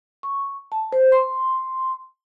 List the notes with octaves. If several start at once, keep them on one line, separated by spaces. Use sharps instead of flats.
C#6
A5
C5
C6